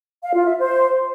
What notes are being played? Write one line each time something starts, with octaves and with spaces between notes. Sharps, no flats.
F5
F4
E5
C5